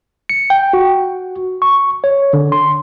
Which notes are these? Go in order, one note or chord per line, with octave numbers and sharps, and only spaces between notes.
C#7
G5
F#4
C#6
C#5
D3
C6